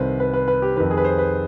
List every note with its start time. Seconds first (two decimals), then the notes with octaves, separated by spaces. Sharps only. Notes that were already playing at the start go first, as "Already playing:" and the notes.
Already playing: C2 C3 D#3 B4 C5
0.20 B4
0.33 B4
0.48 B4
0.62 G4
0.76 F2 D#3 B4
0.91 G#4
0.97 B4
1.05 C5
1.18 B4